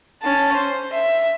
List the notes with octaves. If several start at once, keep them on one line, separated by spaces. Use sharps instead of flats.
C#4 A5
C5
E5